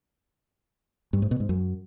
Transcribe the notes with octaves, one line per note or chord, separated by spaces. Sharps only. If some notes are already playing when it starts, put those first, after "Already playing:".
G2
G#2
B2
G#2
F#2